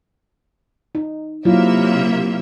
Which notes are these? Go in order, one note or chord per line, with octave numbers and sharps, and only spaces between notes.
D#4
C3 F#3 A#3 E4 F4 E5